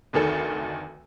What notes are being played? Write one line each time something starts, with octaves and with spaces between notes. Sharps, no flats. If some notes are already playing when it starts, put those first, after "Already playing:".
F1 D2 D#3 A4